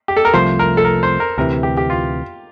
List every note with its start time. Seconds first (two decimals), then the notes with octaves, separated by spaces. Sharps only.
0.08 G4
0.17 A4
0.25 A#4
0.34 C2 C3 F3 A3 C5
0.59 A#4
0.77 A4
0.85 A#4
1.03 C5
1.20 A#4
1.38 D2 C3 E3 A#4
1.63 G4
1.77 G4
1.90 F4